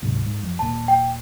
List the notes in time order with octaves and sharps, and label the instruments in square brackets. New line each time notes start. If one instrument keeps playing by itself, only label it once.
[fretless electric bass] D1 G#2 C3
G#2
F2
[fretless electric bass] D#1 A#2 [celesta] A5
[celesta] G5